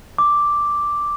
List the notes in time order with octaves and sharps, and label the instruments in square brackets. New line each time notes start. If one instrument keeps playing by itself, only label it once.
[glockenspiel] D6